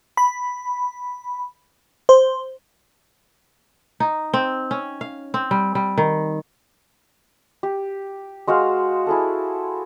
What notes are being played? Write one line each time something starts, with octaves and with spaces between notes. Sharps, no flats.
B5
C5
D#4
C4
C#4
F5
C4
G3
G3
D#3
G4
G#3 F#4 C5 F5
E4 G#4 A4